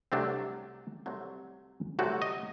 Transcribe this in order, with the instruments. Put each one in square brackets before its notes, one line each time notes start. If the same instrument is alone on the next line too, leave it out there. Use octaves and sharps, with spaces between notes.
[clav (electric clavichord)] C2 C3 F#3 A3 C4 D4
C2 C3 F#3 A3 C4
C2 C3 F#3 A3 C4 F#4
D#5